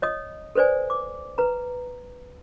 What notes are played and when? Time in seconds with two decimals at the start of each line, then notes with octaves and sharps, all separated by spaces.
0.02 C#5 D#5 D#6
0.55 A4 B4 C5 D5 G#5
0.90 D6
1.38 B4 A#5